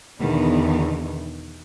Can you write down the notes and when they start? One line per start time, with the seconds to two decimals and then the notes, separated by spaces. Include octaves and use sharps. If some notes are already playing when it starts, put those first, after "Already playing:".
0.20 E2 B2 D3 D#3